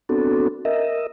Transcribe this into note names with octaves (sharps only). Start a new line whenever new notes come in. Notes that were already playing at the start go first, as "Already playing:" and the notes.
B3 C4 D4 F#4 A4
A#4 D#5 E5